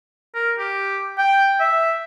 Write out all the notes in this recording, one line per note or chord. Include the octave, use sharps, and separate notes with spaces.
A#4
G4
G5
E5